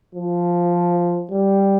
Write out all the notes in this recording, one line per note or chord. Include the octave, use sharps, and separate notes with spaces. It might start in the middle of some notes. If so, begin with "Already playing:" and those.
F3
G3